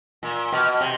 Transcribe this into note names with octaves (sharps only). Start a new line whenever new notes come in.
A#2
B2
C3